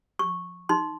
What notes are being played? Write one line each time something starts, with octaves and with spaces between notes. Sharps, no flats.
C#6
D#4 C6